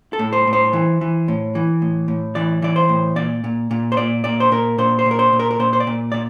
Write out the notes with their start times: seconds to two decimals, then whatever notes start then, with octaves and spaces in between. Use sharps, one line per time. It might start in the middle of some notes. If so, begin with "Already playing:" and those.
0.13 A4
0.19 A2
0.33 C5
0.47 A2
0.53 C5
0.73 E3
1.01 E3
1.28 A2
1.55 E3
1.82 A2
2.08 A2
2.35 E3 D5
2.62 E3 D5
2.76 C5
2.89 A2
3.16 A#2 D5
3.44 A#2
3.71 A#2
3.92 C5
3.97 A#2 D5
4.24 A#2 D5
4.40 C5
4.51 A#2 A#4
4.78 A#2 C5
4.99 C5
5.06 A#2 A#4
5.19 C5
5.33 A#2
5.40 A#4
5.51 A#4
5.60 A#2 C5
5.73 C5
5.80 D5
5.87 A#2
6.12 A#2 D5